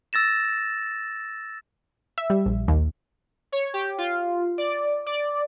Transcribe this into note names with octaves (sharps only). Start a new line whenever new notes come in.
E6 A6 A#6 E7
E5
G3
A#1
D#2
C#5
G4
F4
D5
D5